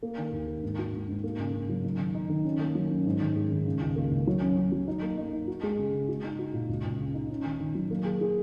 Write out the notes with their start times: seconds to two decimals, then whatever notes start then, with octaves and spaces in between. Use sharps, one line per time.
0.03 A#3
0.18 D#3
0.32 D#2
0.47 A#3
0.63 G#2
0.79 F#4
0.94 G#2
1.09 G#2
1.24 A#3
1.39 C#3
1.54 C#3
1.69 F#3
1.84 D#4
1.99 D#3
2.15 D#4
2.30 D#3
2.45 C#4
2.60 A#3
2.75 F#3
2.91 C#4
3.06 G#2
3.21 D#3
3.36 G#3
3.51 D#3
3.66 C#3
3.81 C#2
3.96 A#3
4.12 C#2
4.27 F#3
4.42 C#4
4.57 C#4
4.72 F#3
4.88 D#4
5.02 A#3
5.18 D#4
5.33 D#4
5.47 F#4
5.63 G#3
5.78 C#3
5.94 C#3
6.09 F#4
6.24 D#4
6.39 F#4
6.54 A#2
6.69 C#2
6.84 C#2
7.00 C#3
7.14 D#4
7.30 C#4
7.45 D#3
7.60 D#3
7.75 F#3
7.91 A#3
8.05 G#4
8.21 G#4